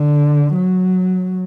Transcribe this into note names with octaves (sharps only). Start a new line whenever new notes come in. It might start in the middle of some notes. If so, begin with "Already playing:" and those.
Already playing: D3
F#3